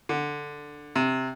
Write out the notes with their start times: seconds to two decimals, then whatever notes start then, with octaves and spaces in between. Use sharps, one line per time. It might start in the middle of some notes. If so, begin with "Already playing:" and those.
0.09 D3
0.96 C3